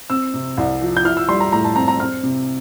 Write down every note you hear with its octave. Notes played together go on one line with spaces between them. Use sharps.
C4 E6
C3
C2
F3
G6
E4 F6
E6
G3 C6
A#5
A2 A#5
A5
C4 A#5
A#5
C4 F6
C3